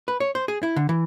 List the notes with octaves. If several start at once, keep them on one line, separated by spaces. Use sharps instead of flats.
B4
C#5
C5
G#4
E4
D3
E3